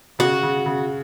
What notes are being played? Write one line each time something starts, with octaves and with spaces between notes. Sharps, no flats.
C#3 F#4
C#3
C#3